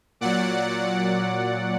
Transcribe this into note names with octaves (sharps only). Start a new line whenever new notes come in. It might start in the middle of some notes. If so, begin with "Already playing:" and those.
A#2 F#3 D5 F#5